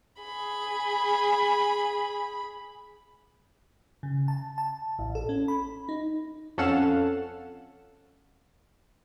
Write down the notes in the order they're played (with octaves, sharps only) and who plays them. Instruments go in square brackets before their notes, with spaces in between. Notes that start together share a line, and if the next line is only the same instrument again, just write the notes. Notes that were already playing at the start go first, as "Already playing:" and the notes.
[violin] G#4 B5
[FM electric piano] C#3
A5
A5
A1
A4
C#4
B5
D#4
[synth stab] F2 C#4 A4 F5 F#5 E7